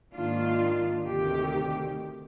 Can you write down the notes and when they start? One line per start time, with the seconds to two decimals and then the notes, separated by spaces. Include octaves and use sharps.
0.13 G#2 D#3 A#3 D4 F4
1.06 D2 C3 D#3 G4